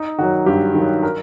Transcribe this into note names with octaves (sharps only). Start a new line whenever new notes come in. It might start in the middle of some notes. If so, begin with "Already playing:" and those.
Already playing: D#4
D#3 F#3 F#4
G2 G4
D#3 F#3
A#4